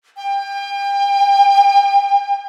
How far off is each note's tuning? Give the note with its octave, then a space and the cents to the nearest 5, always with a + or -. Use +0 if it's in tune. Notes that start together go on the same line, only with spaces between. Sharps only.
G5 +35